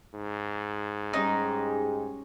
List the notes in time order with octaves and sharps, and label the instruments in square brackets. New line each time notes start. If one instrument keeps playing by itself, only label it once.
[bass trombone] G#2
[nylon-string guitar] G3 C#4 C#5 [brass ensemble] G#3 G4 G#4 [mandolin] D#4